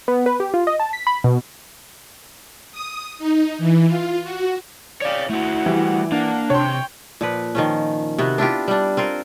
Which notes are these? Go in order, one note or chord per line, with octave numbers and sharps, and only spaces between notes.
B3
B4
G4
F4
D#5
A5
B6
B5
B2
D#6
D#4
E3
F4
F#4
C#5 D5 F5 G5
A3 E4 F#4 F#5
E3 G3
A#3 D4 F#5
C3 C#5 G5 C6
A#2 F3 B4
D#3 F3 C#4
C3 B3 F#4
D4 E4 F4 G4
G3 D4
C4 F4 A#4